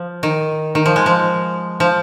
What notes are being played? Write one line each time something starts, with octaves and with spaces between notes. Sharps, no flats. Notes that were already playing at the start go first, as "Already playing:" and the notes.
Already playing: F3
D#3
D#3
F3
G#3
F3
F3